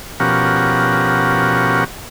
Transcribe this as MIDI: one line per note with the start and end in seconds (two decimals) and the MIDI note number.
0.20 1.84 47
0.20 1.84 53
0.20 1.84 61
0.20 1.84 67
0.20 1.84 70
0.20 1.84 78